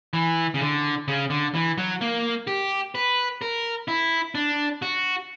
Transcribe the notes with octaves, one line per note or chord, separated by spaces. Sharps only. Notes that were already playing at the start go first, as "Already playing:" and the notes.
E3
C#3
D3
C#3
D3
E3
F#3
A#3
G4
B4
A#4
E4
D4
F#4